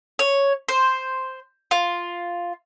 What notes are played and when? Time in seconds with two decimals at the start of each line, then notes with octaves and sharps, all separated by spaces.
0.19 C#5
0.68 C5
1.71 F4